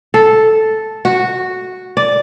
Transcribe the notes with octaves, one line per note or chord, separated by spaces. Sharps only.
A4
F#4
D5